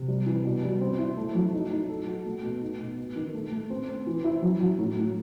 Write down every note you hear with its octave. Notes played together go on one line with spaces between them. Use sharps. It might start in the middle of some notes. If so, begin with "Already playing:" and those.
Already playing: C3
G3
E3
B2
G3
C4
E4
A3
F#3
D#4
D#4
A4
F#4
A3
B2
D#4
B2
B3
D#3
A3
A3
C4
C4
E3
E4
F#3
F#3
A2
A2